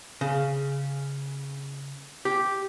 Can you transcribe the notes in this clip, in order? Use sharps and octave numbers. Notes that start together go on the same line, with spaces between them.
C#3
G4